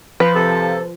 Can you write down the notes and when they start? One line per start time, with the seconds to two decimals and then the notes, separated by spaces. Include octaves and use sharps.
0.20 F3 B4
0.35 C3 A4